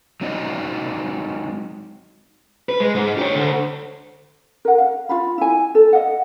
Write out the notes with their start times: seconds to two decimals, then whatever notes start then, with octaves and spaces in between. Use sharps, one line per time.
0.21 F#3 G#3 C4 D#4 D5 D#5
2.69 B4
2.80 G#3
2.95 G#2
3.18 G4 C#5
3.34 D2
4.65 A#4 F#5
4.78 F5
5.09 F4 F5 B5
5.38 E4 G#5
5.75 A4
5.93 D#5 F5 F#5